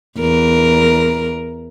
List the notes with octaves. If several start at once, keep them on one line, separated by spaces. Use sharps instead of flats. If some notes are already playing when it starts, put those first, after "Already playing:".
E2 A#4